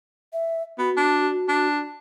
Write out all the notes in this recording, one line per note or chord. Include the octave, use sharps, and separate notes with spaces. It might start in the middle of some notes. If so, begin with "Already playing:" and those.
E5
B3 F#4
D4
D4